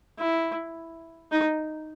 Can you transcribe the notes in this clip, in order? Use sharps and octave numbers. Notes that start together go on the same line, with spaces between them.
E4
D#4